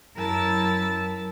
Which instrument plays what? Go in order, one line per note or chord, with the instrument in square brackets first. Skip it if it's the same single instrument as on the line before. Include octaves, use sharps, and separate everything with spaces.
[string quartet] F#2 E4 A#4 A5 E6 A6